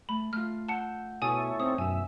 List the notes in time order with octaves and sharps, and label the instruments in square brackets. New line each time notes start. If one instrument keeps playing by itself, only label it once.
[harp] A3 [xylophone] B5
[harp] A3 F4 [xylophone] F6
[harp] F#5 E6 G6 [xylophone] A5 C#7
[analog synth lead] B2 [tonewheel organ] E4 A4 C#5 [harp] E5 [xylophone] G#5 D#6 D#7
[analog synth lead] C4 [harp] D#4 [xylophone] D#6
[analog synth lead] F#2 [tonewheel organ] B2 E5 [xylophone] G#5